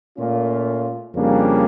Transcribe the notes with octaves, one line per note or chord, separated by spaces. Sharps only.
A#2 A3 C#4 F4
F2 C#3 G3 A#3 D4